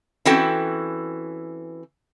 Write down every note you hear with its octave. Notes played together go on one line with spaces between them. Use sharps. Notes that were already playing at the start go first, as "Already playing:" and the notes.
E3 C4 C#4 F#4 A4 G5